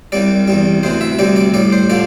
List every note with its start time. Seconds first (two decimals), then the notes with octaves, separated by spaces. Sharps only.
0.12 C2 C3 G3 D5
0.48 E2 C3 G3
0.83 D2 C3 E3 C5
1.01 E5
1.19 D2 C3 G3 D5
1.36 D5
1.54 A2 G3 D5
1.72 C5
1.90 D3 F3 D5